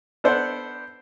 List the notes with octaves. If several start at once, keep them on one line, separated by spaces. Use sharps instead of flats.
B3 D4 A4 C5 D5 F#5